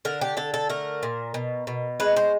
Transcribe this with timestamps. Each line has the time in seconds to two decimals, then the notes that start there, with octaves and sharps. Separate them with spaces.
0.05 D3 A#4
0.21 G4
0.37 D3 A4
0.54 A4
0.70 A3 A#4
1.03 A#2
1.34 B2
1.67 B2
2.00 G#3 B4
2.16 C5